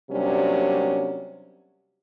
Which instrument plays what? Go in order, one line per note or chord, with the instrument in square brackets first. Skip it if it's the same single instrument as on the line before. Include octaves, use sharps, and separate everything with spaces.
[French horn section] C3 F#3 G3 A#3 C#4 D4